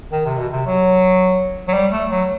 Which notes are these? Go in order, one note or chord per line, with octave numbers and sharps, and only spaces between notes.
D#3
C3
B2
C3
F#3
F#3
G3
A3
F#3